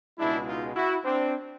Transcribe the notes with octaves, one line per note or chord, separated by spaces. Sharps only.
C#2 B2 G#3 D4 E4
D#4 F4
E4 F#4
C4 D4